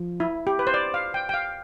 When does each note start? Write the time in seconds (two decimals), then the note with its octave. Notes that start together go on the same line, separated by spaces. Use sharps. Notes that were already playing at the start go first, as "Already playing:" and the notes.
Already playing: F3
0.20 E4
0.47 G4
0.59 B4
0.67 C5
0.74 D5
0.94 F5
1.14 G5
1.29 G5
1.34 F5